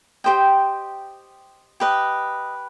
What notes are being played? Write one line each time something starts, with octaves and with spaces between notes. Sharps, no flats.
G4 C5 D#5 G5
G4 B4 D#5